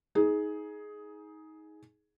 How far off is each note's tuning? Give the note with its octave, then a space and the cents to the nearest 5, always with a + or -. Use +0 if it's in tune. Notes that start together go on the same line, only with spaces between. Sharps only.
D#4 +25 G#4 +10